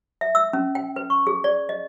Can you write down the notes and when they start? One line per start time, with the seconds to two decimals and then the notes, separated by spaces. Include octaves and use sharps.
0.21 E5
0.35 E6
0.53 C#4
0.75 G5
0.96 B4
1.10 C#6
1.27 G#4
1.44 D5
1.69 D#5